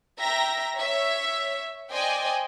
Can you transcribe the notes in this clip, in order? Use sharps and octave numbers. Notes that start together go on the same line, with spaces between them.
E5 G5 A#5 A#6
C#5 E5
C5 D5 D#5 G5 G#5